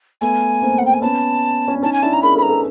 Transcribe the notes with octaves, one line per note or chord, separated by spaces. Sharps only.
A3 B3 G#5
A#3 C4
F#5
G5
G#5
B3 C#4 A5
C#4
D4
C#4 D#4 A5
G#5
D4 E4 A5
A#5
G#4 A#4 B5
A4 B4 B5
A#5
A4 B4